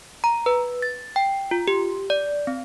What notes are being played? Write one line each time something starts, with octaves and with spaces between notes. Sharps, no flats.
A#5
B4
A6
G5
F4
G4
D5
C4